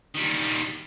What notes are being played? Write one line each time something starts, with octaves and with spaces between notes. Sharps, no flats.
D#3 G3